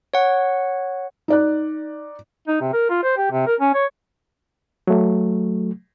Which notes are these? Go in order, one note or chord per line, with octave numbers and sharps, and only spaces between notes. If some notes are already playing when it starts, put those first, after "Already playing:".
C#5 F#5
D#4 D5 F#6
D#4
C3
A#4
F4
C5
G4
C3
A#4
C#4
C#5
F#3 A3